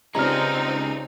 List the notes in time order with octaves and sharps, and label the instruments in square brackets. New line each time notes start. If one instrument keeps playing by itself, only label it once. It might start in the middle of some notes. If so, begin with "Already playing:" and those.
[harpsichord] C#2 G2 [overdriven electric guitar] G#3 C#4 [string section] C4 D#4 [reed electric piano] A#5 F6